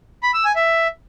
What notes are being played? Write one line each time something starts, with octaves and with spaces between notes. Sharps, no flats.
B5
E6
G#5
E5